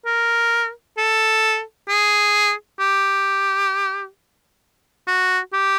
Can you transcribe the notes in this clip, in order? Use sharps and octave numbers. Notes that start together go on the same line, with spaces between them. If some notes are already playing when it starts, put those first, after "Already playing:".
A#4
A4
G#4
G4
F#4
G4